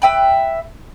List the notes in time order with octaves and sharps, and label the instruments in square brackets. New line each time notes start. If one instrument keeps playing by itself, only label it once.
[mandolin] B4 E5 G5 B5